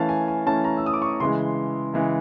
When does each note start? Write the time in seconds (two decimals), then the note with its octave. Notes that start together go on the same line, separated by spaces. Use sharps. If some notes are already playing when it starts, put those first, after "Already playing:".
Already playing: E3 A3 C#4 F5 A5
0.09 G#5
0.28 G#5
0.46 E3 A3 C#4 A5
0.64 A#5
0.77 E6
0.86 D#6
0.94 D6
1.02 C#6
1.20 C#3 E3 G#3 C6
1.93 C#3 E3 G#3